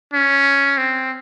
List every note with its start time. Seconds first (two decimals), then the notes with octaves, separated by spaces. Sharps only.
0.14 C#4
0.78 C4